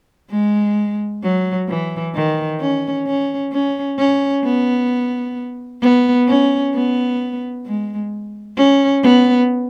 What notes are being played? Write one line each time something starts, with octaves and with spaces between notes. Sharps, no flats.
G#3
F#3
E3
D#3
C#4
C#4
C#4
C#4
B3
B3
C#4
B3
G#3
C#4
B3